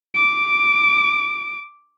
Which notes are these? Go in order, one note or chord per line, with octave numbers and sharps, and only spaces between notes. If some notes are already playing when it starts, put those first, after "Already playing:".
D6 D7